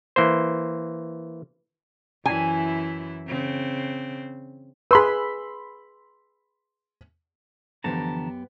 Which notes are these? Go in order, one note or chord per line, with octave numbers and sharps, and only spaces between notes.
E3 A#3 C5
F#2 E3 E4 G#5
C#3 C4
G#4 B4 B5 C6 E6
F#2 D3 E3 F3 B3 G4 A5 A#5